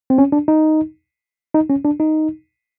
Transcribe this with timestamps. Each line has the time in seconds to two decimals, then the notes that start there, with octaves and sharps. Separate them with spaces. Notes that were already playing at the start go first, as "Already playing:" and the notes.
0.10 C4
0.18 C#4
0.32 D4
0.48 D#4
1.54 D#4
1.69 C#4
1.85 D4
2.00 D#4